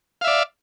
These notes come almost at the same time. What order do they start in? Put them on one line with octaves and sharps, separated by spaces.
F5 E5 D5